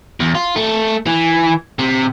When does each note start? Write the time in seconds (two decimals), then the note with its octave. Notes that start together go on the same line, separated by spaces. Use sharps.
0.20 E2
0.35 F4
0.56 A3
1.06 E3
1.79 C3